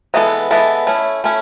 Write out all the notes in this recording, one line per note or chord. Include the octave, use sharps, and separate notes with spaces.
E3 G#3 B3 E4 A4
E3 G#3 B3 E4 A4
A3 C#4 E4
A3 C#4 E4